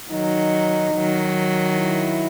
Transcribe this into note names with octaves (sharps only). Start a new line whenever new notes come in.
D#3 F#3 D#4
D#3 F#3
E4